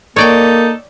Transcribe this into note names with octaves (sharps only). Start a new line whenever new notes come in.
A#3 D#4 A4 C#5 D5 G5